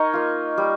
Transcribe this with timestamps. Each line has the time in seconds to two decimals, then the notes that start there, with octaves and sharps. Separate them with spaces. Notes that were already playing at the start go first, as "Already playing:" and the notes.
Already playing: D#4 A#4 C#5 D#5
0.13 A#3 F4
0.57 G3